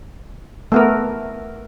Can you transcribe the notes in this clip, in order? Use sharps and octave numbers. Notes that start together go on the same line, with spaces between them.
A3 B3 A#4